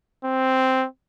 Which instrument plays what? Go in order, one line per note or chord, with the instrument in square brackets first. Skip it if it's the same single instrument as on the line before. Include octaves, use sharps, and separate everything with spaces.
[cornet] C4